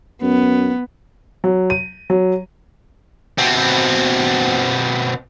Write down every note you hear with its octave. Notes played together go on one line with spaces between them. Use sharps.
F#2 B3
F#3
D#7
F#3
B2 C4